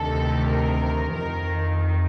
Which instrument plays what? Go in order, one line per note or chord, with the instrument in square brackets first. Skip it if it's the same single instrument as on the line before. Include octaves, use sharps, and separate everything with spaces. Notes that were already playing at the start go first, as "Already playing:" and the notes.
Already playing: [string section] D2 C3 D#3 A4
A#4
F2 D#3 A#4